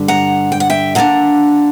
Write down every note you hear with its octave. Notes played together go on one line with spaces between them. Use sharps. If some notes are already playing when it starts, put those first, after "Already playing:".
Already playing: G2 D3 G3
F#5 A#5
G5
F#5
E5 G5
E2 D3 A#3 D4 F#5 A#5